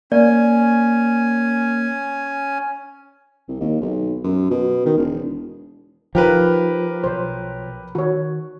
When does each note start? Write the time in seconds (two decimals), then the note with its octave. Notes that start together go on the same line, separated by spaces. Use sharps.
0.12 A#3 C#4 D5 G#5
3.48 C2
3.61 D#2
3.81 B1
4.24 F#2
4.50 B2
4.86 D#3
4.97 E1
6.15 F3 D#4 G4 A#4 B4
7.04 B1 B2 C5 C#5
7.95 D#3 F#4 C#5